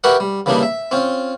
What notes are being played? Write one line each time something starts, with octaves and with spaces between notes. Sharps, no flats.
F#4 G4 A#4 B4 E5 F#5
G3
C#3 E3 G3 A#3 D4 D#4
E5
C4 C#4 F4